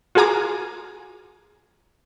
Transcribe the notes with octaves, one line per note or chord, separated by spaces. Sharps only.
F4 F#4 G#4 G#5 A#5 D6